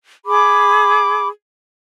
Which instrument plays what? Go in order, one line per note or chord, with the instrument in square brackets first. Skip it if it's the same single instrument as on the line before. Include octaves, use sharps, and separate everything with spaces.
[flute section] G#4 B5 D6